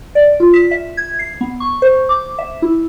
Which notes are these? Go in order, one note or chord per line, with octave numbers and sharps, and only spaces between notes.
D5
F4
B6
E5
G#6
C7
B3
C#6
C5
D6
E5
E4